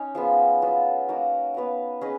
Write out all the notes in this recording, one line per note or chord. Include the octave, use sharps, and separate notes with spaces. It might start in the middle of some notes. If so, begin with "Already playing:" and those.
Already playing: C#4 D#4 C#5
F3 G#3 B3
F#3 B3 F4
A#3 D#4 F#4 A#4
B3 F#4 B4 F5
C#4 G#4 B4 D#5